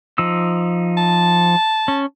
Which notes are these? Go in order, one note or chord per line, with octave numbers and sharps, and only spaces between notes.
F3 D#4 E6
A5
C#4